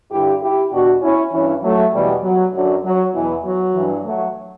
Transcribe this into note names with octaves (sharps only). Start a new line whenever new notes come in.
G2 D3 E4 G4
E4 G4
E2 B2 D4 F#4
C#4 E4
G2 E3 C#4 E4
F#3 A3
E2 B2 E3 G3
F#3
F#2 D3 F#3
F#3
E2 B2 E3
F#3
G2 E3
F#3 A3